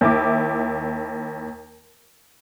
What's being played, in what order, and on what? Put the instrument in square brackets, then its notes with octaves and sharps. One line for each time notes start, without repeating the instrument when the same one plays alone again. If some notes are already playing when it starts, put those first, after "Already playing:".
[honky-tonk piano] D#2 E4 D6